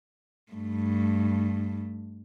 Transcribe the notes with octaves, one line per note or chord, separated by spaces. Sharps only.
G2 A3